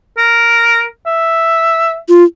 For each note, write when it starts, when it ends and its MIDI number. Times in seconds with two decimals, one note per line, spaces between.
0.17 0.85 70
1.06 1.97 76
2.09 2.24 65